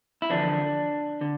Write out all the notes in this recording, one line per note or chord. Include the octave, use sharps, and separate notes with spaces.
E4
E2 D3 F3 B3 D4
D3